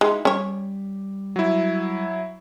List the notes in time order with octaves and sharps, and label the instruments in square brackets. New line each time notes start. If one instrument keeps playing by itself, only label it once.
[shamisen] G#3 [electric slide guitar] D#4 E4 F#4
[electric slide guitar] G3 [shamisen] C#4 C#5
[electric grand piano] F#3 E4